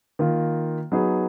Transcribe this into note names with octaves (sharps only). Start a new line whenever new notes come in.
D#3 A#3 F4
F#3 B3 D#4 G#4 B4